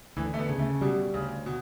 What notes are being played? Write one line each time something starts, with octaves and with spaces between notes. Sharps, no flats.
D2 E3
A3
B3
C#3
A3
B2 G3
D2 C#3
B2